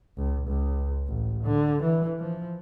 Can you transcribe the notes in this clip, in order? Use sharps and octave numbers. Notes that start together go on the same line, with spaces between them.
C#2
C#2
A1
D3
E3
F3